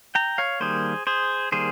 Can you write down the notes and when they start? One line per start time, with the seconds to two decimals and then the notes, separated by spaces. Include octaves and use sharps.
0.15 G5 A#5
0.38 C#5 F5
0.60 D#3 G3 A#3 G#4 C5
1.07 G#4 C5
1.52 D#3 G3 A#3 G#4 C5